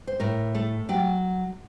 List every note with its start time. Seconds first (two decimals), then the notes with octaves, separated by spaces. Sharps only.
0.07 C5
0.20 A2 A#4
0.54 A3 A4
0.89 F#3 G4